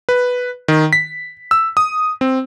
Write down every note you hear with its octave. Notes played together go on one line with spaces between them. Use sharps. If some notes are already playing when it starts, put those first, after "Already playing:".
B4
D#3
B6
E6
D#6
C4